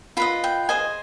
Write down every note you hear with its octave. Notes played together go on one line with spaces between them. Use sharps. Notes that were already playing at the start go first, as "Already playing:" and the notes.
F4 B4 D#5 B5
G5
G#4 C5 D#5 G#5